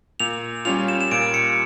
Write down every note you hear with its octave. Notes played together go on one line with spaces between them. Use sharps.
A#2 F7
G3 C#4 F4 F7
E7
E7
A#2 D7
C#7